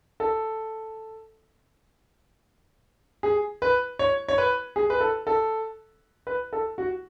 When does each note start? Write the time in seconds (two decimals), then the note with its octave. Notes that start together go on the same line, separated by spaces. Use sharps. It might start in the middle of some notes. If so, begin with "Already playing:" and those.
0.20 A4
3.23 G#4
3.62 B4
3.99 C#5
4.28 C#5
4.38 B4
4.76 G#4
4.90 B4
5.01 A4
5.27 A4
6.27 B4
6.53 A4
6.78 F#4